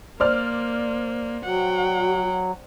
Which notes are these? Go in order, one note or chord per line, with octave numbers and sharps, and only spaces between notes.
A#3 C5 D5 F6
F#3 F#4 F#5 G5